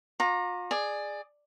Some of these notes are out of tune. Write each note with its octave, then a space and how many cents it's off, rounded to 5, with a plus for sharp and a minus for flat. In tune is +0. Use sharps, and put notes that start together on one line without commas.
F4 +40 A#5 +0 D6 +0
G#4 +0 D5 +20